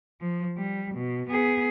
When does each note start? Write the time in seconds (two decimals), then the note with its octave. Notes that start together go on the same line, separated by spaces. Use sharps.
0.21 F3
0.58 G3
0.95 B2
1.29 B3 G#4